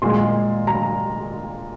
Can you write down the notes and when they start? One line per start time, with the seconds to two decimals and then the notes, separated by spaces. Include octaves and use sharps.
0.02 A#2 G#3 C6
0.67 A#5